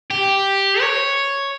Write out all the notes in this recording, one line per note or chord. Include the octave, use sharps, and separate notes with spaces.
G4
C#5